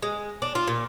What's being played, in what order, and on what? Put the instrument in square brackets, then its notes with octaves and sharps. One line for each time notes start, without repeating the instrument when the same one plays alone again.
[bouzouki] G#3
D4
F4
A#2